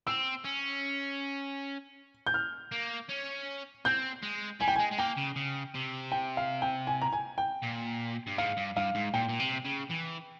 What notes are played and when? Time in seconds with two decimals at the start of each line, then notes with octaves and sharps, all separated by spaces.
0.07 C4 E6
0.45 C#4
2.27 G6
2.34 F6
2.72 A#3
3.09 C#4
3.85 C4 G6
4.22 G#3
4.61 G3 G#5
4.68 G5
4.76 G#3 G#5
4.92 G#3
4.98 A#3 G5
5.17 C#3
5.36 C#3
5.74 C3
6.12 G5
6.37 F5
6.62 G5
6.87 G#5
7.02 A#5
7.13 G#5
7.38 G5
7.63 A#2
8.27 G2
8.38 G#2 F5
8.57 G2
8.76 G2 F5
8.95 G#2
9.14 A#2 G5
9.29 A#2
9.40 C3
9.65 C#3
9.90 E3